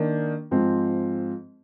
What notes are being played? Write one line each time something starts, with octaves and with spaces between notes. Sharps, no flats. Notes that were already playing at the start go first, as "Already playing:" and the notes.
Already playing: D#3 A#3 D4
G#2 F3 C4